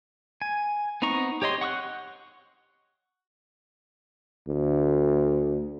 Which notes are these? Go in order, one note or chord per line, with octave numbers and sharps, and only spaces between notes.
G#5
B3 C4 D#4 A#5 C#6
G4 C#5 D#5 C6
F#5 C#6 D#6 F#6
D2